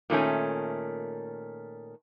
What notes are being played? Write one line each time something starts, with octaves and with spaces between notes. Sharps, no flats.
A#2 D#3 A3 C#4